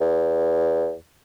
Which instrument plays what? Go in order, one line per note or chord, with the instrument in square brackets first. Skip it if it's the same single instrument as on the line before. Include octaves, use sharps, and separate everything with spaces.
[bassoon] E2